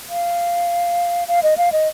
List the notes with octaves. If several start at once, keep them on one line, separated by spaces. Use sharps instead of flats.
F5
F5
D#5
F5
D#5